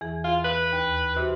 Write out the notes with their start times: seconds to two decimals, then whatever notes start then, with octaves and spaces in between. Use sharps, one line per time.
0.01 E2 E3 G#4
0.24 F4
0.44 B4
0.73 D#2
1.16 C3 F#4 G4